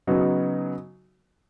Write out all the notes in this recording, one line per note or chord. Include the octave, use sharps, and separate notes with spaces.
C#3 F#3 B3 D#4 F#4